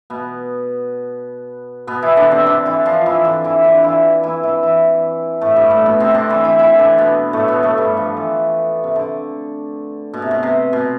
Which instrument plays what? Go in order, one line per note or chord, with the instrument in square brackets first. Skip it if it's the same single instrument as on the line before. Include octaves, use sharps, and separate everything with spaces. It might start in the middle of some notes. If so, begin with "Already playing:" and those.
[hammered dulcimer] B2 B3
B2 B3
E3 E4
D3 D4
C3 C4
D3 D4
E3 E4
F3 F4
E3 E4
D3 D4
E3 E4
D3 D4
F4
E3 E4
E3 E4
E3 E4
E3 E4
A2 A3
G2 G3
A2 A3
B2 B3
C3 C4
D3 C4 D4
E3 E4
E3 E4
E3 E4
D3 D4
B2 B3
A2 A3
B2 B3
A2 A3
G2 G3
F3
E3
C3
D3
B2
C3
B2
C3
B2